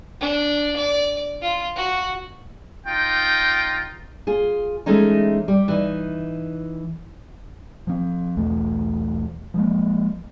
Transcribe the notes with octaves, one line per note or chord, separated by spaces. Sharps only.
D4
D5
F4
F#4
D#4 F4 G5
F4 G#4
E3 G#3 A3 C#4 D#4
G3
E3 D#4
F3 C4
B1 E2 A3
F3 G#3 A#3